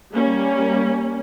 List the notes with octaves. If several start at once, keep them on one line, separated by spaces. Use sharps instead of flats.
G3 A#3 C#4